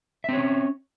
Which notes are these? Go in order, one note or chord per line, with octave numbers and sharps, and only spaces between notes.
C4 C#4 C#5 E5